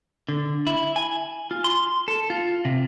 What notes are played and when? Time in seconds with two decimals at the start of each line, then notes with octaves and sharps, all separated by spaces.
0.29 D3
0.67 E4
0.96 G#5
1.51 F4
1.64 C6
2.08 A4
2.30 F4
2.65 C3